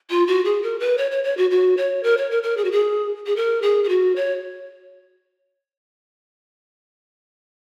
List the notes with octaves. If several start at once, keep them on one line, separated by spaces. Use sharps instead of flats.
F4
F#4
G#4
A#4
B4
C#5
C#5
C#5
F#4
F#4
C#5
A#4
C#5
A#4
A#4
G#4
F#4
G#4
G#4
A#4
G#4
G#4
F#4
C#5